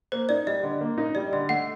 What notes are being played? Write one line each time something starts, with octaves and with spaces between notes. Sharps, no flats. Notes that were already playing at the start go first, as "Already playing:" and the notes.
A#3 C5
D#4 D5
G3 D#5
D3
A#3
D#4
G3 D5
D3 D#5
A3 F#5